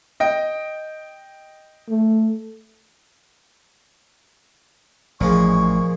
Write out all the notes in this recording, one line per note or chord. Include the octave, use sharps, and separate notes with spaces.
D#5 G5
A3
A1 A#2 F3 G#3 C#6